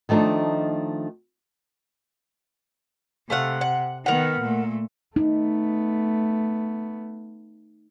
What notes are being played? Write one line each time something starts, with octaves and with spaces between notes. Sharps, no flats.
D#3 F3 A3 D4 D#4
C3 A3 F5 F#5
F#5
D#3 B3 A#4 F#5
A#2 A3
A3 B3 D#4